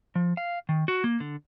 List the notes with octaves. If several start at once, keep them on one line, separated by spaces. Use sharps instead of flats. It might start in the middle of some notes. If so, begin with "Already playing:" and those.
F3
F5
D#3
F#4
A#3
D3